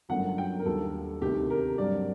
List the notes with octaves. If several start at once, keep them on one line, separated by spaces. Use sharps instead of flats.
G1 F#2 D3 F#3 A3 F#5
G5
A#4
D#2 D3 G3 A#3 A4
D2 C3 D#3 A3 G4
A#4
G2 F#3 C4 D5